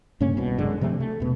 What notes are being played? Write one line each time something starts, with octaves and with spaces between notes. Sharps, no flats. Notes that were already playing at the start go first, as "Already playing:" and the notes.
G2 C#3 A#3 C#4
C2 B2
G1 F#2 D3 G#3
C3 F3 A3 C4
A3
E1 B2